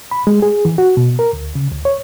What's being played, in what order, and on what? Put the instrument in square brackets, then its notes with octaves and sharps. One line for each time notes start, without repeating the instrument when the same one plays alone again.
[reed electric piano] B5
G#3
G#4
E3
F#4
B2
A#4
D2
C#3
D2
C#5